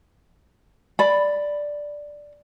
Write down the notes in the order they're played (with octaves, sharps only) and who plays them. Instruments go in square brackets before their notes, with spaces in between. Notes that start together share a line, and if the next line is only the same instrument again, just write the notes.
[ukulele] D5 B5